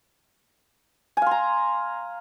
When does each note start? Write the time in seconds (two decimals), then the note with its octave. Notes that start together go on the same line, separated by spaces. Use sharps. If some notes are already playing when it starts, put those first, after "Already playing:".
1.17 G#5
1.22 F5
1.26 C6
1.31 A#5